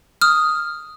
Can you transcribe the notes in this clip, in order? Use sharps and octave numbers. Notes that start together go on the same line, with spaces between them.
D#6 F6